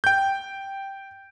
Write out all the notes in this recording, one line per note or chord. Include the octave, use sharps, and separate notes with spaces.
G5 G6